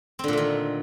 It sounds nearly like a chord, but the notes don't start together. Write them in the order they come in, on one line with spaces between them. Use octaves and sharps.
C4 D3 A#2 A3 D#3